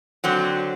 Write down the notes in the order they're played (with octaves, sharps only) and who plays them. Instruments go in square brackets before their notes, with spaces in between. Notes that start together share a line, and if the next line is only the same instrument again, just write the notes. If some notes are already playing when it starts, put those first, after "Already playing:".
[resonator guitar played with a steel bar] D3 F#3 C4